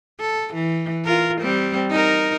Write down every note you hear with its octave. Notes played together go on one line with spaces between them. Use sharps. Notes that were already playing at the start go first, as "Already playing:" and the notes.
A4
E3
F4 A#4
G3 C4
D#4 A#4